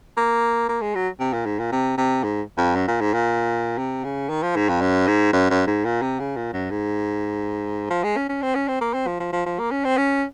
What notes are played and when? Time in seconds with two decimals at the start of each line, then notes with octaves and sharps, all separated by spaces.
0.17 A#3
0.69 A#3
0.82 G#3
0.95 F#3
1.20 C3
1.33 A#2
1.46 G#2
1.59 A#2
1.72 C3
1.98 C3
2.24 G#2
2.58 F2
2.76 F#2
2.88 A#2
3.01 G#2
3.14 A#2
3.78 C3
4.04 C#3
4.29 D#3
4.43 F3
4.56 G#2
4.69 F2
4.81 F#2
5.07 G#2
5.33 F#2
5.50 F#2
5.67 G#2
5.85 A#2
6.02 C3
6.20 C#3
6.37 A#2
6.53 F#2
6.71 G#2
7.90 F3
8.04 G#3
8.17 C#4
8.29 C#4
8.42 C4
8.55 C#4
8.68 C4
8.81 A#3
8.94 C4
9.07 F3
9.20 F3
9.33 F3
9.46 F3
9.59 A#3
9.71 C#4
9.85 C4
9.97 C#4